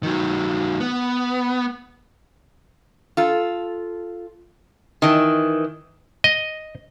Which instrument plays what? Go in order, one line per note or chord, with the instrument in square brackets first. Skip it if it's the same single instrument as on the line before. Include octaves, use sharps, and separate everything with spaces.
[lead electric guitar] D#3 F#3
B3
[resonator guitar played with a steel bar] F4 A4
D#3 E3
[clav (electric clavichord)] D#5